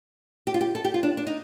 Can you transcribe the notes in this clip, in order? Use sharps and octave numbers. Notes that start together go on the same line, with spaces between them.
G4
F4
G4
A4
G4
F4
D4
D4
D#4